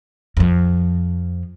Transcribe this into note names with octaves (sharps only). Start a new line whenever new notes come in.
F2 F3